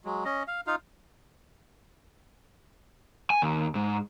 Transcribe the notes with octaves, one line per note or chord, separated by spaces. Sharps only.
F#3 G#3
C#4 D#5
F5
D#4 F4 F5
G#5
D#2
G#2